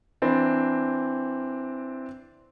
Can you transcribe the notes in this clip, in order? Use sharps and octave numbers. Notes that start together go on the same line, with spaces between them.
E3 C4 D4